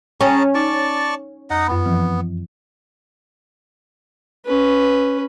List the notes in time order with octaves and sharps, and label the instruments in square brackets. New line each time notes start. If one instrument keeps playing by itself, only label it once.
[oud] C#4 [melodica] G#4 A5 A#5 [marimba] G5
[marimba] D#4 [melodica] D5 A5 C#6
[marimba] F2 [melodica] D#4 D#5 F#5
[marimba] F#2 F#5 B5 [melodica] B3
[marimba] E3 F3 C4
[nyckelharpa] C#4 B4